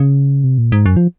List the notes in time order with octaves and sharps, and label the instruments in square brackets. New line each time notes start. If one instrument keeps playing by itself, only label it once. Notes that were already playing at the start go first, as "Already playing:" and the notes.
Already playing: [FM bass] C#3
C3
A#2
G#2
F#2
F3